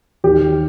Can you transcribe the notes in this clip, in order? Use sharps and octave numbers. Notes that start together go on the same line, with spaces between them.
D#2 D#3 G4